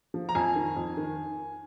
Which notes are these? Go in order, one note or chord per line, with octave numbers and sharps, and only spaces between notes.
F3
A#5
F2 G#5
D#3
F2
D#3